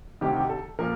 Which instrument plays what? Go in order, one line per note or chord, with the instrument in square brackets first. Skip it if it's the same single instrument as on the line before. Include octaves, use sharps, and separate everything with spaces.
[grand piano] D2 C3 D#3 G4
G4
A4
A#2 F3 A#4